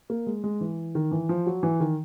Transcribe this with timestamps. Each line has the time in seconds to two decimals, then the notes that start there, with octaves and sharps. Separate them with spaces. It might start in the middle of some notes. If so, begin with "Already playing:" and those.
0.10 A#3
0.27 G#3
0.44 G#3
0.61 E3
0.95 D#3
1.12 E3
1.29 F3
1.46 F#3
1.63 E3
1.80 D#3